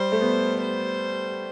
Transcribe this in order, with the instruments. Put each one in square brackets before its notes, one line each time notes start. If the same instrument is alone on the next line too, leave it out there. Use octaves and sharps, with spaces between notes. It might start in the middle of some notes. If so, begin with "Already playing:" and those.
Already playing: [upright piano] G3 [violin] C5
[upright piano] A3
B3
[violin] C5